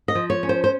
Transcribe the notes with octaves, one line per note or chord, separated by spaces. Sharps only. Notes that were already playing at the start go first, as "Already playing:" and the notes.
D#5
F3
C#5
C#4
C5
C5